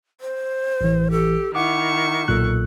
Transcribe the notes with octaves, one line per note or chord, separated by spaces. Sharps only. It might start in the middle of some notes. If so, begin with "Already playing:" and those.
C5
A1 E3
G4 A4
D#3 E4 F#5 C#6 D6
B1 A#2 A4 F#6